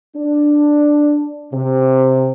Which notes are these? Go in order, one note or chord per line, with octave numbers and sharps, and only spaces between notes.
D4
C3